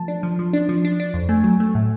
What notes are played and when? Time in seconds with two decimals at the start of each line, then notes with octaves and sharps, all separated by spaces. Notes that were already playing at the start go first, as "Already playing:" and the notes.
Already playing: F3 A3 A5
0.08 D4
0.23 F3
0.39 F3
0.53 D4
0.69 F3
0.85 D4
1.00 D4
1.14 F2
1.29 A3 G#5
1.44 F#3
1.60 A3
1.75 A2